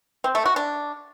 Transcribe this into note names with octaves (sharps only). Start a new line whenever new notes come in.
C4
A3
F#4
D4